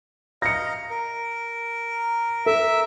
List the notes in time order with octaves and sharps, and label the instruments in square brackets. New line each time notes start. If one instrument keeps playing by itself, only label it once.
[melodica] D#5 F5 A#5 [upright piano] A#6 C#7
[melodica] A#4
[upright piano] A4 [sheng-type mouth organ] E5